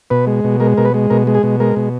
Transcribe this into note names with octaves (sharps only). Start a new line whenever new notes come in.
B2 B4
G#3
B2
G#3 A#4
B2 A#4
B4
G#3
B2 A#4
G#3
G#4
B2
G#3 A#4
B2